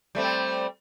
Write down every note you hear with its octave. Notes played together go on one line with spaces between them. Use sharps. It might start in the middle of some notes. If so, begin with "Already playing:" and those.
G3 A3 C4